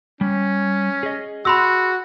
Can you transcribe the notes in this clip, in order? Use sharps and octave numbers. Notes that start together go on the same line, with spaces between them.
G3 C#4
G#4 D#5
F#4 B5 C6 E6